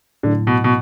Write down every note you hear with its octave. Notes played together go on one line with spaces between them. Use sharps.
A2 D3 F#3 A3 E4
B2
B2